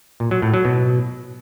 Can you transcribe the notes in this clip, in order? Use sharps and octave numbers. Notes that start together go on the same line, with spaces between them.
A#2
F#3
A2
F#3
B2